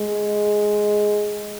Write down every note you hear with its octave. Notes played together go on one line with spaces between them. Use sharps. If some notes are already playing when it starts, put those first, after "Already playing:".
Already playing: G#3